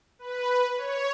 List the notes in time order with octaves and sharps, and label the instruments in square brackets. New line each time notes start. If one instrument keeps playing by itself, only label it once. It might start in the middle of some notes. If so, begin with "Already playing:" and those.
[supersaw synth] B4
C#5